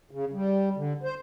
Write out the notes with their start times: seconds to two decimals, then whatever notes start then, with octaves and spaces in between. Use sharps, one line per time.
0.11 C#3
0.33 G3
0.77 D3
1.03 C5